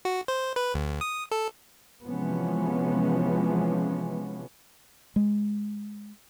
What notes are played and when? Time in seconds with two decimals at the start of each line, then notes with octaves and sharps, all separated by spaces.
0.05 F#4
0.28 C5
0.56 B4
0.74 D2
1.01 D#6
1.31 A4
2.06 C3 E3 F3 G#3 B3 C#4
5.16 G#3